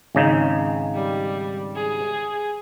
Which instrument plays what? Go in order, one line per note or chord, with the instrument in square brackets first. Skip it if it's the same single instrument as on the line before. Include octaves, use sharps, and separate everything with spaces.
[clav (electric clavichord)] G#1 C#3 D#4
[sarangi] G3
G#4